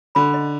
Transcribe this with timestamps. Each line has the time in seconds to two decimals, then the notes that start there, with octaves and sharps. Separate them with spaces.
0.15 D3 B5
0.34 D#5